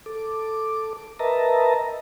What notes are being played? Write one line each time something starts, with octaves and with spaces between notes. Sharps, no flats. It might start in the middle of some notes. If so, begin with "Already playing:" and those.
A4 D6
A#4 B4 D#5 E5 A5 A#5